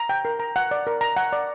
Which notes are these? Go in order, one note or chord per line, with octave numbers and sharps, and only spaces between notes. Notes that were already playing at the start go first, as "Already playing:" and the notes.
Already playing: A#5
G5
A#4
A#5
F#5
D5
A#4
A#5
F#5
D5